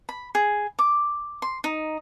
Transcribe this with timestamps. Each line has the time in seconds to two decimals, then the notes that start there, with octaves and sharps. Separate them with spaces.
0.09 B5
0.35 G#4
0.79 D6
1.42 C6
1.64 D#4